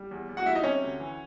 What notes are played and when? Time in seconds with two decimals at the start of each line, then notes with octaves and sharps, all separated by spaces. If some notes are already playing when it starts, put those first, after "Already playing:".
Already playing: G3
0.11 E2
0.29 E2
0.37 F#4 F#5
0.46 G3 E4 E5
0.55 D#4 D#5
0.63 C3 C#4 C#5
0.82 D2
1.00 E3